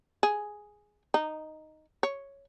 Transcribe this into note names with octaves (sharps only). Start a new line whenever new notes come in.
G#4
D#4
C#5